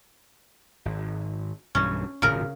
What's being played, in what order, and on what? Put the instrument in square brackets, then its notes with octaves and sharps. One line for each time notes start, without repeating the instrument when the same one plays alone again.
[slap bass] G#1
[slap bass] B1 G2 E3 [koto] C#4
[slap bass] D1 G#1 A#2 [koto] C#3 A#4